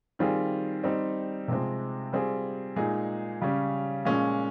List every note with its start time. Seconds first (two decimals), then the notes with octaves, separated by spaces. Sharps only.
0.19 D#3 G3 C4 F4 G#4
0.84 G3 C4 D#4
1.48 C3 F3 G#3 C4
2.13 G3 C4 F4 G#4
2.76 A#2 G#3 D#4 G#4
3.41 C#3 G3 C#4
4.05 A#2 F3 G#3 C#4